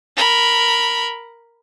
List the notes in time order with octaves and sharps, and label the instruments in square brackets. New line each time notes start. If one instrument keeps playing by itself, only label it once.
[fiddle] A#4 B5